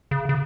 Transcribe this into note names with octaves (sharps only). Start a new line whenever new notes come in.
C#3
C#3